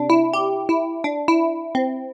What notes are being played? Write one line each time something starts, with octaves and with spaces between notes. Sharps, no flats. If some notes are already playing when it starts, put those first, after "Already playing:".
Already playing: C3 D4
E4
G4
E4
D4
E4
C4